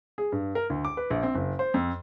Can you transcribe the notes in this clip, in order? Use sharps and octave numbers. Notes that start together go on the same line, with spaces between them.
G#4
G2
A#4
D2
D6
B4
A#1
C4
F#1
C5
F2